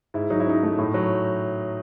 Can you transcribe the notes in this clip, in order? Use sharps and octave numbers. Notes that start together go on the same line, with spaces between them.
G#2 E4
F#3 D#4
E4
C#4 D#4
A3
A2
F#3